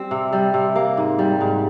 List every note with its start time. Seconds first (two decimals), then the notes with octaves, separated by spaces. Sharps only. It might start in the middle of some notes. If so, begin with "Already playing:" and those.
Already playing: G3 C4
0.11 C3
0.33 G3
0.54 C3
0.76 A#3
0.97 G#2
1.19 G3
1.41 G#2